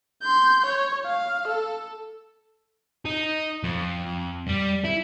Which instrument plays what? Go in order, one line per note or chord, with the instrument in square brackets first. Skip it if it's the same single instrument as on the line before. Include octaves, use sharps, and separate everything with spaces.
[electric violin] C6 G6
C#5
F5
A4
[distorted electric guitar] D#4
F2
G3
E4